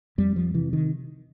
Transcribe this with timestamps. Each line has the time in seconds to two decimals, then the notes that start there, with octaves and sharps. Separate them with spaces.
0.18 F2 G3
0.36 F3
0.54 C3 E3
0.73 D#3